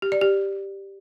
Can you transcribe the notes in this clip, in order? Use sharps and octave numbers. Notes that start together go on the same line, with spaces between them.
G4
D5
G4